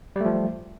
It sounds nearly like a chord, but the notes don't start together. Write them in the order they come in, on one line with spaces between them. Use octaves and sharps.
G3 A3 F3